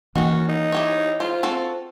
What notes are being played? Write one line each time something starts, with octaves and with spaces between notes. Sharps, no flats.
D#3 E3 A#3 C#4 D4 F#4
D#4
E4 G4 C#5
F4 C5
C4 F#4 A4